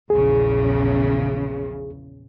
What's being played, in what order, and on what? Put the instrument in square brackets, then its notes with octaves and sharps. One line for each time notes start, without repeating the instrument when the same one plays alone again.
[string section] A#1 E2 C#3 [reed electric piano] G#4